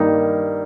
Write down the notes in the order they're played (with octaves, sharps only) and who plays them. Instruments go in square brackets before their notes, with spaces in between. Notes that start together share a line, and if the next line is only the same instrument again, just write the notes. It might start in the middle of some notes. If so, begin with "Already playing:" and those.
Already playing: [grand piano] G2 D#3 A#3 D#4